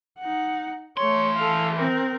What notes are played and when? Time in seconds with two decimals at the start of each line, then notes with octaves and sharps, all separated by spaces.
0.20 D#4 F#5
0.97 E3 A3 C#5 C6
1.37 A4 F5
1.76 C4 A#4